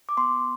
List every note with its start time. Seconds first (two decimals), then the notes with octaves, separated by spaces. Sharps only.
0.09 D6
0.17 B3 C6